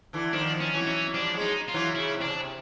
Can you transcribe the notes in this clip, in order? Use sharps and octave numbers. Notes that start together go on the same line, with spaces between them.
D3 E3
D#3 F3 D4
C#4
E3 F#3
C#4
F3 G3 D4
F#3 G#3
D#4
F4
E3 F#3
C#3 E4
C3
C#3 D4
C3